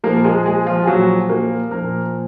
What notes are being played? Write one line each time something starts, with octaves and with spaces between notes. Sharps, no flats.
A#2 F3 A#3 A#4
G#3 G#4
G#3 G#4
F3 F4
G#4
A#2 F3 F#3 F#4
A#3 A#4
A#2 F3 A#3 A#4